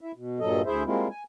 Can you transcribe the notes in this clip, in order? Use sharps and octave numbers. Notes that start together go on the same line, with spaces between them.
E4 E5
B2
G2 A#2 F#3 A4 D#5
D2 E4 G#4 C5 E5
G3 G#3 A#3 C4 E4 F4
G#5